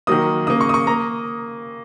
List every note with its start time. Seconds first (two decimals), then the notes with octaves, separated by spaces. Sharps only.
0.07 D#3 F#3 A#3 D#6
0.47 C#3 A#3 D#6
0.61 C#6
0.69 D#6
0.74 C#6
0.87 A#3 A#5